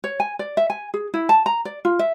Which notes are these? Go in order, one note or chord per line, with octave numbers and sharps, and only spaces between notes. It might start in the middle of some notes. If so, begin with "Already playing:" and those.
C#5
G#5
D5
E5
G#5
G#4
E4
A5
A#5
D5
F4
E5